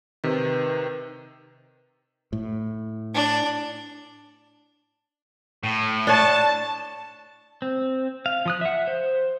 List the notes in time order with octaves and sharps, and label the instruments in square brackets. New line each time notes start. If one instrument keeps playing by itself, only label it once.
[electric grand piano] C3 D#3 [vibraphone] B4
[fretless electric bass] A2
[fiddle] D4
[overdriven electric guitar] A2
[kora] D4 C#5 [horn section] A5
[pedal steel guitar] C4
F5
F3 D#6 F#6
E5 F#5
C5